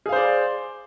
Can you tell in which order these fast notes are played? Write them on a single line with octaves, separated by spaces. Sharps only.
G#4 F5 C5 D5